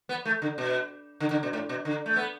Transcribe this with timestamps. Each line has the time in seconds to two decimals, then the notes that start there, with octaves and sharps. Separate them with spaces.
0.09 B3
0.25 A3
0.42 D3
0.58 B2
1.20 D3
1.31 D3
1.43 B2
1.53 A2
1.69 B2
1.85 D3
2.06 A3
2.16 B3